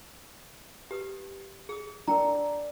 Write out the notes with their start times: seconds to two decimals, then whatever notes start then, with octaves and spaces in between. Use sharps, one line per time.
0.91 G4 B4 D#6
1.69 G#4 D#6
2.08 D4 A#4 G5 A#5